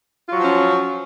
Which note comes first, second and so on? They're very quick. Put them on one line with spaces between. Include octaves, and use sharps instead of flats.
F4 F#3 F3 C#4